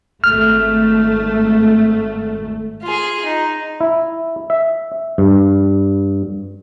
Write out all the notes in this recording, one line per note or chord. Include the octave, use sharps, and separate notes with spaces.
G#1 A3 F6
F4 G#4
D#4
E4
E5
G2